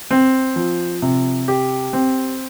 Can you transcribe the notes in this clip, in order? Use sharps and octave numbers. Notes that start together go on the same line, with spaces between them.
C4
F3
C3
G4
C4